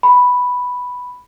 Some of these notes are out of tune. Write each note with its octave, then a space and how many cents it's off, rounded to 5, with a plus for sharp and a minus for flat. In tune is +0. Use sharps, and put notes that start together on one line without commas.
B5 +0